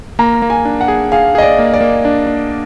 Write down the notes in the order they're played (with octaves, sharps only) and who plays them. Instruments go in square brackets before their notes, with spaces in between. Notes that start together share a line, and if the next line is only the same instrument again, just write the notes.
[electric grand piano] A#3 [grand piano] A#5
[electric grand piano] A#3
[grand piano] G#5
[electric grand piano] D4
[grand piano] F#5
[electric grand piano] G#4
[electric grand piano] G#4 [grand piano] F5
[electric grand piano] G#4 [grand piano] D#5
[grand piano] D5
[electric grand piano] A#3
[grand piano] D5
[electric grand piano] A#3
D4
D4